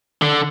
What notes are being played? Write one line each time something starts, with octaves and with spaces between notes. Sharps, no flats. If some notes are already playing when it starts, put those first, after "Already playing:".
D3